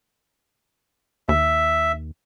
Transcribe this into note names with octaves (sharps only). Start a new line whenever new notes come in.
D#2 E5